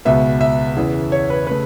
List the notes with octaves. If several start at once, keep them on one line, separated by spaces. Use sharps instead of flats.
C#2 B2 B3 E5
E5
E2 C#3 E3 B3
C#5
B4
C#3 A3 B4